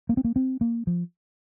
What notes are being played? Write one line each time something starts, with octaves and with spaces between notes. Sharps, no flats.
A#3
C4
A#3
C4
A#3
F3